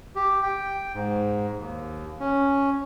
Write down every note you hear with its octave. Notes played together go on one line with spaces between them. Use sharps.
G4
G5
G#2
D#2
C#4